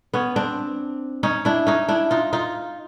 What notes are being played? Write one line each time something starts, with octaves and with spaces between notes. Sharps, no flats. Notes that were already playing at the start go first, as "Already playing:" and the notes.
B3 C#4
C4 D4
C#4 D#4
D4 E4
C#4 D#4
D4 E4
D#4 F4
D#4 F4